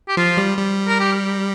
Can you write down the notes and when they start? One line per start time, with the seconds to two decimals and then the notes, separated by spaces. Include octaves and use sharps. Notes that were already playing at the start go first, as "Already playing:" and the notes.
0.08 G4
0.17 F3 F4
0.37 G3
0.58 G3
0.87 A#4
1.00 G4